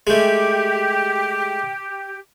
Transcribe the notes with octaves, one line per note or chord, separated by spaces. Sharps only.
G#3 A3 G4